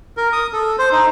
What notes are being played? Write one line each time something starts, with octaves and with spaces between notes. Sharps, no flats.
A#4
D#6
A4
C5
D#4